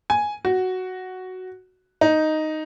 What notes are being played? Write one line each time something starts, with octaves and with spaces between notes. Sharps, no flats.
G#5
F#4
D#4